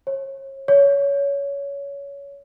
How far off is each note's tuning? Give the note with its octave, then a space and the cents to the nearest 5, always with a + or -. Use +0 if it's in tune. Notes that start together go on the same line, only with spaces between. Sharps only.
C#5 -35
C#5 +20